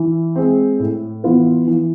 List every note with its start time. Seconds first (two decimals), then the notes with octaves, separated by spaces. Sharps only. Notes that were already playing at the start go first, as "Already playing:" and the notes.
Already playing: E3
0.36 G#3 C4
0.80 A2
1.24 E3 B3 F4 B4
1.67 E3